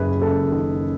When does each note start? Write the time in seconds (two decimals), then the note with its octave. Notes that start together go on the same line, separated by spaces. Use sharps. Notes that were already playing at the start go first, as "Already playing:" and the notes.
Already playing: F#1 F#2 G#4 B4
0.21 F#1 A4
0.52 D#3